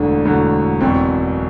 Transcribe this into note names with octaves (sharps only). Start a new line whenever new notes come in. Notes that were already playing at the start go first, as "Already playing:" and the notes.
Already playing: E1 D2 D3 F#3 D4
E1 D2 D3 F#3
F#1 E2 B2 F#3 C4